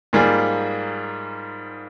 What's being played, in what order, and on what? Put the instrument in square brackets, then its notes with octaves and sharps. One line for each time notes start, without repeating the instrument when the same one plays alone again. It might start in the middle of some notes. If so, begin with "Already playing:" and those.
[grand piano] G#2 G3 A#3 F4 G#4